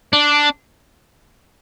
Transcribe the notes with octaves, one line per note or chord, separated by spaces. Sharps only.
D4